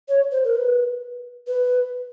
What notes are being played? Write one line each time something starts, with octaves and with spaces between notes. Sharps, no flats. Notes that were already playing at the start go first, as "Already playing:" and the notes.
C#5
C5
A#4
B4
B4